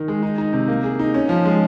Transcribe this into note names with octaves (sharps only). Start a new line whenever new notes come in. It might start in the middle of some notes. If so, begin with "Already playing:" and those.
Already playing: D#3
G#3
D#4
D#4
C3
A#3
G#4
D#4
C#4
F3
G#3